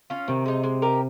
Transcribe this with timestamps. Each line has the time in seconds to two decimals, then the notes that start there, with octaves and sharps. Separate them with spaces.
0.10 C#4 F4
0.28 C3 D#3
0.46 G#3 D#4
0.64 G#3
0.82 D#4 G4 A#4